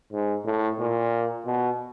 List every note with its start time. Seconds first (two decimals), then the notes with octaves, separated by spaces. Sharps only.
0.12 G#2
0.45 A2
0.79 A#2
1.46 B2